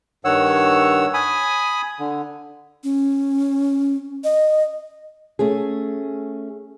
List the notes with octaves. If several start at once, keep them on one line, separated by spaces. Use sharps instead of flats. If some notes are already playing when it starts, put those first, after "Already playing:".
G2 D#3 C#5 F#5 E6
G#5 B5 D#6
D3
C#4
D#5
A3 C#4 G#4